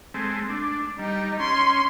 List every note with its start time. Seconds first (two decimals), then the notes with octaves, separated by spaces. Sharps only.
0.14 G#3 A3 C4
0.50 D4
0.99 G3 D#4
1.40 C#4 C6